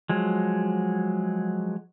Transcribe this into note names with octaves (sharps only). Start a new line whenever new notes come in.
F3 F#3 G#3